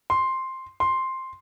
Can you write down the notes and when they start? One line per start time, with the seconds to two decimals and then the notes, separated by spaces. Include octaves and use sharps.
0.10 C6
0.80 C6